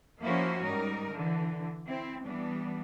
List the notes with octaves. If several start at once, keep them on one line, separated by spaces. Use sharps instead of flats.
F3 A#3 C#4 E4 F#4 C5
G#2 G3 D#4 A#4
D3 E3
C4 E4
E3 G3 B3 D4